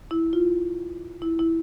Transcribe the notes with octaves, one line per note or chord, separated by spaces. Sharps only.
E4
F4
E4
E4